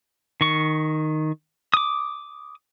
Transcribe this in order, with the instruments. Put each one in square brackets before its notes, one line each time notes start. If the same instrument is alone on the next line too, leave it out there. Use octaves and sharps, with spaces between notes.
[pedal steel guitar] D#3 C#6
D6 D#6